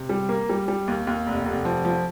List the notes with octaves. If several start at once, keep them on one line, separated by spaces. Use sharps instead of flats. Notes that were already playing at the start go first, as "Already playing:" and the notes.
Already playing: C3
G3
A#3
G3
G3
D#2
D#2
F1
F1
F3
F3